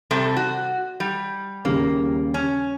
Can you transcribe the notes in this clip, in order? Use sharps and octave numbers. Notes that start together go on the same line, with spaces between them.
C3 G3 A4
F#4
G3
D#2 C#3 G3 A#3
C#4